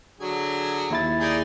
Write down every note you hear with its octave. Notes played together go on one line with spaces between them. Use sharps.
D3 F#3 G#4
D#2 E4 A6
D#4 G#4 D5